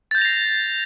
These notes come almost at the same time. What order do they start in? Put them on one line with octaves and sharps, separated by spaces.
A6 G6 A#6 F7 C7